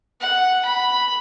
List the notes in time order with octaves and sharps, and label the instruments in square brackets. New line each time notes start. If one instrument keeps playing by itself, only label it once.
[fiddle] F#5
B5